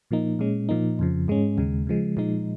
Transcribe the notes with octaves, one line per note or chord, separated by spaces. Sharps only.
A#2 F3 A#3 D#4
A#2 G#3 C#4
A#2 F3 A#3 D#4
F2 C#3 F3
G#2 G#3 C#4
D#2 C#3 G#3
C#3 F3 G#3
A#2 F3 G#3 D#4